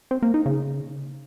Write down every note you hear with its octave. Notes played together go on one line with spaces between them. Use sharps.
C4
A#3
D#4
C#3